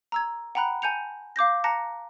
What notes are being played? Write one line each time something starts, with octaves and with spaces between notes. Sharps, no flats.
A#5 E6 G#6
F#5 G5 A#5 B5 F#6
G#5 A5 G6 C#7 F7
F5 D6 G6 A#6
A5 A#5 F#6 A#6 C#7